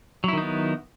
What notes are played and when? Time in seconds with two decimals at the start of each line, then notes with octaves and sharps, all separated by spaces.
0.24 F#3
0.28 E4
0.33 D#3
0.38 D#4
0.42 B3